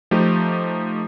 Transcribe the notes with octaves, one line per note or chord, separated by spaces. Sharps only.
F3 A3 D#4 G4